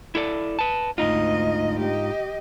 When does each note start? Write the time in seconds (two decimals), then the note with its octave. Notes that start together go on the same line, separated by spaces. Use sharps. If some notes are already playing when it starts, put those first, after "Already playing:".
0.15 E4 A4 D5
0.59 B4 A5
0.98 D2 G#2 D#4 F4 D#5
1.79 G4 D#5